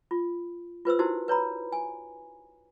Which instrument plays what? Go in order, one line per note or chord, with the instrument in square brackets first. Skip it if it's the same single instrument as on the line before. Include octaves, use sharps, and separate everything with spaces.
[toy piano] F4
F4 B4 C5 E6
D#4 E4 F#4 G4 A#4 C5
B4 C#5 A#5 B5
G#5